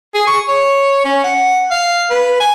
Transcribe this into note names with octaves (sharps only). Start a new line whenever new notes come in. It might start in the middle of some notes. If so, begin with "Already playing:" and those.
G#4
C#6
C#5
C#4
F#5
F5
B4
G#5